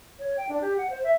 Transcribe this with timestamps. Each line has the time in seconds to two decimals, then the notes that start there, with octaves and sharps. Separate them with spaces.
0.19 C#5
0.37 G5
0.49 D4
0.61 G4
0.78 F#5
0.90 C5
1.04 E5